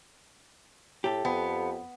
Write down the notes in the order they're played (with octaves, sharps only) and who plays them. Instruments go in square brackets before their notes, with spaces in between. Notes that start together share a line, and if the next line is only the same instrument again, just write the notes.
[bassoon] A2 [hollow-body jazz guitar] G4 A4
[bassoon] F2 [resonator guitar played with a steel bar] B3